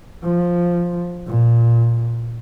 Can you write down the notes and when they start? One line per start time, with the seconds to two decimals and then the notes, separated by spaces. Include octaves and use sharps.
0.23 F3
1.27 A#2